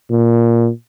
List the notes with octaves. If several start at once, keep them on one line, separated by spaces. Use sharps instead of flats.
A#2